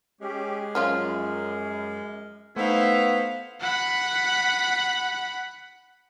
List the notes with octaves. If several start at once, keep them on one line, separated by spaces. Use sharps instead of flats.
G#3 C#4 G4
F#2 F3 C#4 F4 F6
A3 B3 D#4 E4 C5 F5
F#5 B5